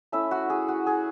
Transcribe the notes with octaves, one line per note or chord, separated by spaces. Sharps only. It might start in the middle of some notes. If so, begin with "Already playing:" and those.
A3 C#4 E4 E5
F#4
G#4
F#4
G#4